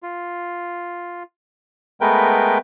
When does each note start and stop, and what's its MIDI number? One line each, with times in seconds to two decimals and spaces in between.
0.03 1.23 65
2.01 2.58 56
2.01 2.58 57
2.01 2.58 59
2.01 2.58 70
2.01 2.58 71
2.01 2.58 79